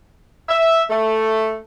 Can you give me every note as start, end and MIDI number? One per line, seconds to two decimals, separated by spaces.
0.49 0.83 76
0.89 1.56 57